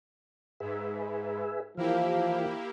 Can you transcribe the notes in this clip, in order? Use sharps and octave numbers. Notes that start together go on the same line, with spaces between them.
G#2 G#4 B4 E5
E3 F3 A#3 E4 F4 G4